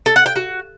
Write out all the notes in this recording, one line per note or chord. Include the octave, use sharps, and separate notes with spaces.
A4
F#5
G5
F#4